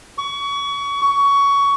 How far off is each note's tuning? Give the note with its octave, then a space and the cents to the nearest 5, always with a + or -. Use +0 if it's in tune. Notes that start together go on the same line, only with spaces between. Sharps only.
C#6 +30
C#6 +20